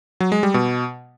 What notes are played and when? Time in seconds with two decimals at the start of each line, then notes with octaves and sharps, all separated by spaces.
0.20 F#3
0.32 G#3
0.43 G3
0.54 B2